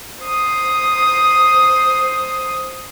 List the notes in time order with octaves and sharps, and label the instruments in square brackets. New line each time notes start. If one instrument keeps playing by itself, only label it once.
[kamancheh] C5 D#6